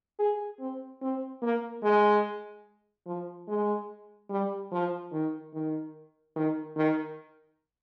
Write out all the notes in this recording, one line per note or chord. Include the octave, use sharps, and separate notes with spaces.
G#4
C4
C4
A#3
G#3
F3
G#3
G3
F3
D#3
D#3
D#3
D#3